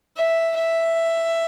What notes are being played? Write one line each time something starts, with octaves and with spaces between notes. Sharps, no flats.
E5
E5